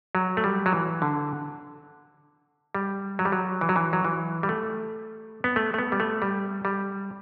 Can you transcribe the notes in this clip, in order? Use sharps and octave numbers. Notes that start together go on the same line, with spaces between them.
F#3
A3
G3
F#3
E3
D3
G3
F#3
G3
F#3
E3
F#3
E3
F#3
E3
G3
A3
B3
A3
A3
B3
G3
A3
G3
G3